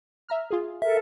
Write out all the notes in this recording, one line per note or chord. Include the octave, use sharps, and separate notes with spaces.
E5 A#5 F6
F4 G#4
A4 A#4 E5